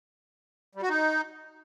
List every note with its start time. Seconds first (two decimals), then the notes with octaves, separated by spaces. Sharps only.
0.75 G3
0.82 F#4
0.89 D#4